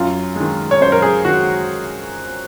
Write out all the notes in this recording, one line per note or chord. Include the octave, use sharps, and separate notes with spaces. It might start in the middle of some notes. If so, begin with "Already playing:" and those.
Already playing: F#2 F4
D#3 G#3
C#5
F#2 C5
A#4
G#4
D#3 G#3 F#4